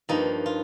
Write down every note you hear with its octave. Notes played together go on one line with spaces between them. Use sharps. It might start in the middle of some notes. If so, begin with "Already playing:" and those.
G2 F3 A#3 D#4
F4